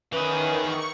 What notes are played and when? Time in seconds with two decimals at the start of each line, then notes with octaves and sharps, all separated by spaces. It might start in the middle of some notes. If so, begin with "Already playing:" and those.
0.13 D#3 E3 C#4 G#4 B4
0.61 C#6